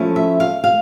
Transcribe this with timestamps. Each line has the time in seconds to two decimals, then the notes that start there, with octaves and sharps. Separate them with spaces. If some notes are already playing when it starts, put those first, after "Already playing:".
Already playing: F3 A3 C#4 E4
0.16 E5
0.40 F5
0.64 F5